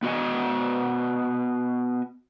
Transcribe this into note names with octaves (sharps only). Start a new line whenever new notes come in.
B3 F#4 D#5 G#5